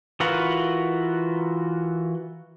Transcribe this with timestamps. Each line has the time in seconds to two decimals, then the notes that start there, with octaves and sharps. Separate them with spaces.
0.20 E3 F4 F#4 A#4 B4